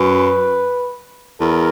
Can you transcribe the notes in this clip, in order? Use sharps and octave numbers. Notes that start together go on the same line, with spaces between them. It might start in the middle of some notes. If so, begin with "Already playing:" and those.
Already playing: F#2 B4
E2 A#4